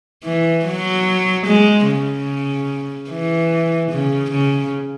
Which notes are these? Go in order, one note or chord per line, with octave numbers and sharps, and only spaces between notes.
E3
F#3
G#3
C#3
E3
C#3
C#3